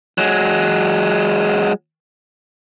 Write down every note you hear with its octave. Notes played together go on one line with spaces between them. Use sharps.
F#3 G#3